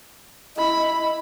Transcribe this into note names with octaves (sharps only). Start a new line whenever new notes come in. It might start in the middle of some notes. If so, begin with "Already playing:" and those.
E4 D#5 B5